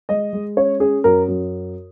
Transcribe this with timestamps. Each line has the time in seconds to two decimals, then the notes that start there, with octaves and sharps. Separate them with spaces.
0.09 G#3 D#5
0.33 G#3
0.57 C#4 C#5
0.80 C#4 G#4
1.04 F#2 A#4
1.28 F#2